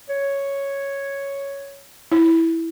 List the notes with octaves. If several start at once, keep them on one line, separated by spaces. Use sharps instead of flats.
C#5
E4